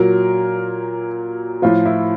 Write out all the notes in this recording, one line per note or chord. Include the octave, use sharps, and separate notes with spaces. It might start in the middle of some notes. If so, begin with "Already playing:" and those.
Already playing: A#2 F#3 A#4
A2 F3 F4
E4